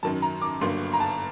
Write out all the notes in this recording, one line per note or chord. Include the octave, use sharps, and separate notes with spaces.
F#2 D#3 F#3 A5
A#5
D6
G1 G2 F#3 A#3 C6
A#5
A5